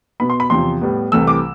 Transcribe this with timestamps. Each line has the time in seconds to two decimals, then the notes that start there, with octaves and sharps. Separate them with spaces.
0.20 B2 B3 B5
0.30 C6
0.40 B5
0.50 E2 C3 F3 C6
0.81 A2 G3 B3
1.12 C2 C3 E3 A3 E6
1.27 D6